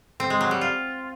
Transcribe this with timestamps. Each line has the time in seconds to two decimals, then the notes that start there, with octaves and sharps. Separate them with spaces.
0.20 C4
0.30 G#3
0.41 F#3
0.51 G3
0.61 F4